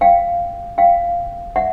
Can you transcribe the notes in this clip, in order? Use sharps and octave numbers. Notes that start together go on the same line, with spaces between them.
F5 G5
F5 G5
E5 F#5